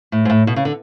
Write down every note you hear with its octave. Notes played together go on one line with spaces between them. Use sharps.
A2
G#2
A2
B2
C#3
D3